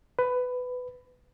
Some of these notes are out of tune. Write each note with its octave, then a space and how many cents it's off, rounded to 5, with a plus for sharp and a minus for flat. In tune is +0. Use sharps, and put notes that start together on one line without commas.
B4 +15